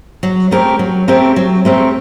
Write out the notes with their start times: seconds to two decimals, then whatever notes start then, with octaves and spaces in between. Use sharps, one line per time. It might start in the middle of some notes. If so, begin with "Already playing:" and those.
0.23 F#3
0.51 A3 C4 G4 A#4
0.79 F#3
1.08 A3 C4 G4 A#4
1.36 F#3
1.65 A3 C4 G4 A#4